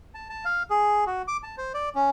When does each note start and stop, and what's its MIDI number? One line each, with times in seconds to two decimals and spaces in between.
0.15 0.28 81
0.30 0.45 81
0.45 0.63 77
0.70 1.04 68
1.07 1.22 66
1.28 1.37 86
1.43 1.56 81
1.58 1.72 72
1.74 1.89 74
1.95 2.10 61